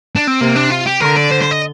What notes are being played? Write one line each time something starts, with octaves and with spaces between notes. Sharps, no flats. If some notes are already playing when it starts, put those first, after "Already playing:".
D4
C4
C3 A#3
D4
F4
G4
D3 A#4
D5
C5
C5
D#5